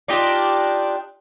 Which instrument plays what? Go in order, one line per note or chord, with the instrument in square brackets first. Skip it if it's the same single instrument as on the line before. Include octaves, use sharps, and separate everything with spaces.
[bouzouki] D4 D#4 F4 G4